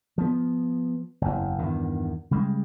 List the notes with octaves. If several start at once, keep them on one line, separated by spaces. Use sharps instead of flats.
F3 B3
F#1 E2
E2 G2 D#3
C#3 G3 G#3